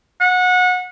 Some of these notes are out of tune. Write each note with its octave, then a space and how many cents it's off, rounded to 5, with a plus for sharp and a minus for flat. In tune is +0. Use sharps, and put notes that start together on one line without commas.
F#5 -25